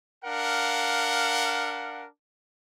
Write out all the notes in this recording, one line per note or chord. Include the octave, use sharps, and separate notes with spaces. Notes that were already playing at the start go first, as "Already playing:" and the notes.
D4 A#4 F5 F#5